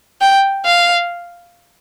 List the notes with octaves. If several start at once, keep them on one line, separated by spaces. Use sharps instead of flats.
G5
F5